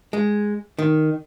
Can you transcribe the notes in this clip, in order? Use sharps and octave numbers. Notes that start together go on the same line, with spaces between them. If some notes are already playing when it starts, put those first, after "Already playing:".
G#3
D#3